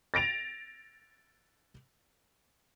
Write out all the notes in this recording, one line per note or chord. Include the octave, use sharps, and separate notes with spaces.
A6 A#6 D7 F7